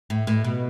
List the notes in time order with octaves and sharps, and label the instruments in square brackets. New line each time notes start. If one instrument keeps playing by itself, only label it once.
[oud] A2
A2
B2